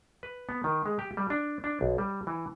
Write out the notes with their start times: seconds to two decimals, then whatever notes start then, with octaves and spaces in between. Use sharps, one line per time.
0.23 B4
0.49 B3
0.64 D#3
0.86 G#3
0.99 G4
1.17 G3
1.30 D4
1.64 D4
1.81 B1
1.98 G3
2.27 E3